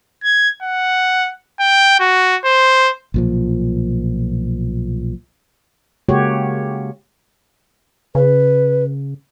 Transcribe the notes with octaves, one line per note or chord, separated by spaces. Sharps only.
G#6
F#5
G5
F#4
C5
B1 A#2 F3
C#3 G#3 A#3 F#4 G4 C#5
C#3 B4